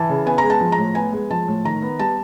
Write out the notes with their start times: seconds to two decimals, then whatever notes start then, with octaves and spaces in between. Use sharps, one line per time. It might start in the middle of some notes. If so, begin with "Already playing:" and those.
Already playing: E3 A5
0.09 C#3
0.26 B3 G#5
0.38 A#5
0.43 G#3
0.50 A5
0.61 F3
0.72 A#5
0.78 A2
0.95 B3 G#5
1.13 G#3
1.30 F3 A5
1.48 A2
1.65 D#3 A#5
1.82 B3
1.99 G3 A5